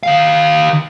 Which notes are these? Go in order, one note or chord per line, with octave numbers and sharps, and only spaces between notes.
D#3 F5